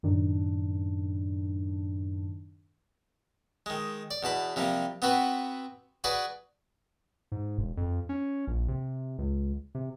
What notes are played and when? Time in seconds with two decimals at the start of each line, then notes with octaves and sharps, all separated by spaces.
0.03 F#2 A2 D#3 D4
3.66 D#3 G#3
4.11 D5
4.23 E2 B2 A5 B5
4.56 C3 F3 G3 A#3
5.02 B3 C4 F#4 B4
6.04 F#4 G#4 B4 D5
7.32 G#2
7.58 E1
7.77 F2
8.09 C#4
8.47 A#1
8.68 C3
9.18 C#2
9.75 C3